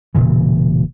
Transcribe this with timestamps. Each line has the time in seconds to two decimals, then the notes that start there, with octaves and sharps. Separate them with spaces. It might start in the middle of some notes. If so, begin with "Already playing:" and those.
0.15 E1 A#2 C#3 E3